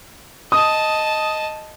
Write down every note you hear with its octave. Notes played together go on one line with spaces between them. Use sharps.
D#5 A5 D#6